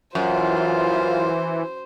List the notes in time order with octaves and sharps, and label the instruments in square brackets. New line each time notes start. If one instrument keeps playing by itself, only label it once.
[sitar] F#2 [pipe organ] E3 [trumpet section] F4 [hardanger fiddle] C5